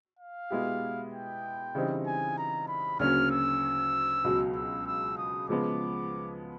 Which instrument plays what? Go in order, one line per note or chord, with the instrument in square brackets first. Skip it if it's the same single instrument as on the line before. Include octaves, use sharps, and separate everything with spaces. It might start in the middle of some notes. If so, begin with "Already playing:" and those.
[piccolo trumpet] F5
[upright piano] B2 G#3 B3 E4 G4
[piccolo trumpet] G5
[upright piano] C#3 E3 G3 C4 D#4
[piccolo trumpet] G#5
A#5
B5
[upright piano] D2 C#3 F#3 A#3 C#4 [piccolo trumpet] F6
[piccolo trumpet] E6
[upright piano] C#2 B2 F#3
[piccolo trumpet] E6
E6
D#6
[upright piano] C#3 F3 G#3 B3 [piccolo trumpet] D6